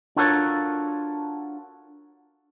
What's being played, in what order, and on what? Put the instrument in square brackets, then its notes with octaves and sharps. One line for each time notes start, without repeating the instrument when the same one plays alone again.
[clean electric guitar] D4 F4 F#4 A4 A#4 C#5